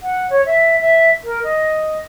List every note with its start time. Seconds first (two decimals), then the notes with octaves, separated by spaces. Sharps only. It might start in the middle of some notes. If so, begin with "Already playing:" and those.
0.01 F#5
0.30 C#5
0.46 E5
0.81 E5
1.24 A#4
1.44 D#5